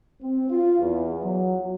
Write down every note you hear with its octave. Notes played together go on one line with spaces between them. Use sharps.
C4
F4
E2
F#3